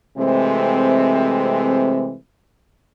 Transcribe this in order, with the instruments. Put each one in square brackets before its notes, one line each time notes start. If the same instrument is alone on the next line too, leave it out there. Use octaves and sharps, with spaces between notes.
[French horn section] C3 E3 G#3 A3 C4